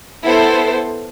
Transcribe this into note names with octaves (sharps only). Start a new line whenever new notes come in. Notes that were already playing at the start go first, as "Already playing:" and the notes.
B3 E4 A4 C5